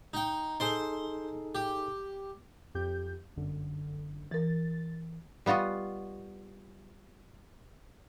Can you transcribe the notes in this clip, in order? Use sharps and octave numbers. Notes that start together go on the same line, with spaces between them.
D#4 G5
D#4 G#4 A4 C5 C6
G4
F2 G4 G6
G1 F#2 D3
E3 A#4 A6
G3 B3 F4 F#4 D#5